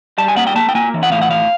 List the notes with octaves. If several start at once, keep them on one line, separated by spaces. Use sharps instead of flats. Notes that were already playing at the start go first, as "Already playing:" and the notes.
G3 A5
G#5
A#3 F#5
G5
A#3 A5
G5
A#3 G#5
E3
F#5
A2 F5
F#5
A2 F5